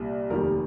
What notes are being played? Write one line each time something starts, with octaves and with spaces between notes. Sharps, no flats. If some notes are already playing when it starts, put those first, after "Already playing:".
Already playing: C2 A#2 G3
F1 D#2 D#3 G3 A#4